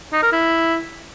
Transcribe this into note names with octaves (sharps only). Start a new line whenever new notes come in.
D#4
A#4
E4